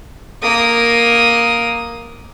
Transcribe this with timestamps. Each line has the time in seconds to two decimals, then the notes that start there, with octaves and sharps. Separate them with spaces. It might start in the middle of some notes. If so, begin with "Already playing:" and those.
0.42 A#3 D#6